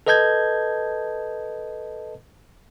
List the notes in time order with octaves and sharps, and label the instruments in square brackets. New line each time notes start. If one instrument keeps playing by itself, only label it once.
[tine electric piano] A4 B4 D#5 A5 G6 G#6